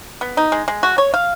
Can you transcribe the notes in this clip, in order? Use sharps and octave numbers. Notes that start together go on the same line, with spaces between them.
B3
D#4
G#3
G#3
F#4
C#5
F5